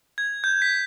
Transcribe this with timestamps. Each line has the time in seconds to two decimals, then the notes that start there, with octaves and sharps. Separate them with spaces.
0.18 G#6
0.44 G6
0.62 B6